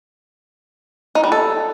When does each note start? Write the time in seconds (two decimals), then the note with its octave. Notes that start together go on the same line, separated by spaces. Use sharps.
1.15 D#4
1.24 G3
1.32 A4